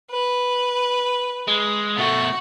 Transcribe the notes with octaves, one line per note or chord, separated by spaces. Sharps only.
B4
G#3
B2 A3 F#4